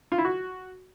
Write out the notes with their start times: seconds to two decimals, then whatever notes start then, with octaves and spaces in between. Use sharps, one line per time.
0.12 F4
0.18 E4
0.25 F#4